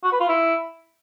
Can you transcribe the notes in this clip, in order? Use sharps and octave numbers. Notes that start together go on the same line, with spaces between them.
F#4
B4
F4
E4